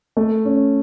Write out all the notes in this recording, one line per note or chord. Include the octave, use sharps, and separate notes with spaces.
A3
C#4